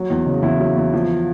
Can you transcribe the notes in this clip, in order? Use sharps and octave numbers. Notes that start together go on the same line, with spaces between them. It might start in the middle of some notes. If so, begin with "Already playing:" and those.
Already playing: F#3
E2
C#3
E2 E4
F#3
E2
F3